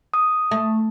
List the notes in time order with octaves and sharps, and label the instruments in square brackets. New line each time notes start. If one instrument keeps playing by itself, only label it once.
[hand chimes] D#6
[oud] A3